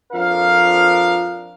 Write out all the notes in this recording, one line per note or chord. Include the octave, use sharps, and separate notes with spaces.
F2 F3 D4 A#4 F5